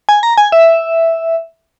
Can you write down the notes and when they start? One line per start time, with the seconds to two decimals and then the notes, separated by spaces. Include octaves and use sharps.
0.09 G#5
0.23 A#5
0.38 G#5
0.52 E5